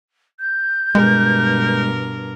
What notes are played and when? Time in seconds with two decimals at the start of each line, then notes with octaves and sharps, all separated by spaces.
0.40 G6
0.95 G2 B2 G#3 A#4